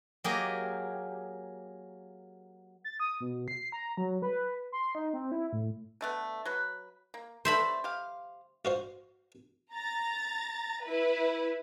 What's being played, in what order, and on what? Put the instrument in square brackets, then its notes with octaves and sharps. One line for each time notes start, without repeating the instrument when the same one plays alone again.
[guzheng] F#3 A#3 G4 G#4 D#5
[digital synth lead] A6
D#6
B2
C7
A#5
F#3
B4
C6
D#4
C4
E4
A2
[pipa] D3 A3 B3
F#3 B4
A#3
[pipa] A3 B3 D4 [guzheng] C5 E5 B5
[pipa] G4 F5
[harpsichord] F4 F#4 C5
[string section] A#5 A6
E4 B4